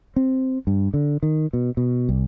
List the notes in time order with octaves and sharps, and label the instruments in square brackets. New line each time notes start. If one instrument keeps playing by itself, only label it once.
[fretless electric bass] C4
G2
D3
D#3
B2
B2
C2